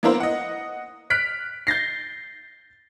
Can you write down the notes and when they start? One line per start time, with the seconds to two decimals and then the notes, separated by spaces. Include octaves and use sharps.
0.03 A#3 B3 D4 E4 A#4 C5
0.20 D#5 F#5
1.10 F6 F#6 B6 D7
1.67 G6 A6 A#6 C7